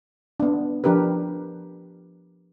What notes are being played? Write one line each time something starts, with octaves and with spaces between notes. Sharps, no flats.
B3 D4
F3 D4 G4 A#4 B4